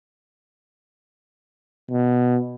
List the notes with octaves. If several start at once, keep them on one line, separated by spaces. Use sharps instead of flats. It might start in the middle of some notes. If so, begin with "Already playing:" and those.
B2